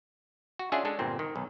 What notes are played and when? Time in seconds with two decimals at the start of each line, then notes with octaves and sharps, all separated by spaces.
0.59 F#4
0.72 C#4 D4 F4 G#4 E5 F#5
0.85 G#3 D4 A4
0.99 G1 A#2 C4
1.19 D#3
1.36 B1